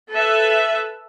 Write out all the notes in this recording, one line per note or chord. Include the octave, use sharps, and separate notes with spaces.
A4 B4 E5